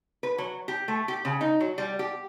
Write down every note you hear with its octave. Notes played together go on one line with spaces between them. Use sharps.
B4
F#3
G4
A3
G4
C#3
D#4
F#3
G3
G4